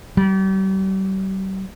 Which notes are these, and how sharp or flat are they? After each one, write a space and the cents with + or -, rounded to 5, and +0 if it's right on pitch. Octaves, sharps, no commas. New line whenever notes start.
G3 -40